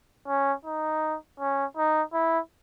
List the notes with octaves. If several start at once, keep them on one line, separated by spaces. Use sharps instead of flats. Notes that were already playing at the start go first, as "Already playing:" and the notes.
C#4
D#4
C#4
D#4
E4